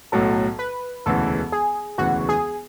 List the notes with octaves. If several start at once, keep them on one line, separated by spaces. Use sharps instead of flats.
B1 A2 F#3 A4
B4
E1 D2 C#3 E3 A4
G#4
E1 D2 C#3 E3 F#4
G#4